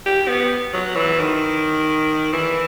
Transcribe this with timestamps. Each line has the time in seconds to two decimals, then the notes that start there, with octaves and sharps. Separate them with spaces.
0.06 G4
0.28 B3
0.73 F#3
0.96 E3
1.19 D#3
2.33 E3